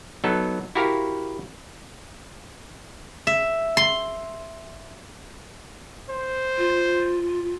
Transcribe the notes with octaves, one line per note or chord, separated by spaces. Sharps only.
F#3 B3 D#4 A4
E4 F#4 G4 A#4 C5 F5
E5
C6
C5
F4